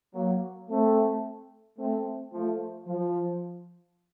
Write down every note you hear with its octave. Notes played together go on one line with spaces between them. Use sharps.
F#3 A#3
A3 C4
A3 C4
F3 A3
F3